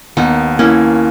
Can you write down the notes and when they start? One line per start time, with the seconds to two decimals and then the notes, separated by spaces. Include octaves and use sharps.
0.17 D#2 B3 D#4
0.59 A#3 C#4 E4